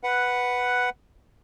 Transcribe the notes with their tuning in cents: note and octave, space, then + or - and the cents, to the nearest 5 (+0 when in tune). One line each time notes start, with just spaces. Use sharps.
B4 +0 F#5 +0